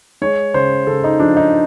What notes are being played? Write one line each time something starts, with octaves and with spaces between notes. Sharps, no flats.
G#3 C#5
C#3 C5
C#3 A4
D#4
F3 D4
D#4